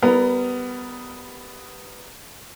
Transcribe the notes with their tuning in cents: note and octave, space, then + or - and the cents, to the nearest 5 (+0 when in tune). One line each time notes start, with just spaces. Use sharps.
G3 +0 B3 +10 A#4 -15